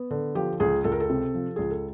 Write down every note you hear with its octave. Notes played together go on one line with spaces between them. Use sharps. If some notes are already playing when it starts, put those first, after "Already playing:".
Already playing: B3
D3
F3 G4
C#2 G#4
C#2 A4
A#4
A4
C3
F3
C#2 G#4
A4